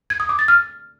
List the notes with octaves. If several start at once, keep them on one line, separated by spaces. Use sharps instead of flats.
G#6
D#6
D6
A6
F6